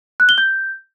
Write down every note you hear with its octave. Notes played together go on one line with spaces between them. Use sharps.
F#6
G7
G6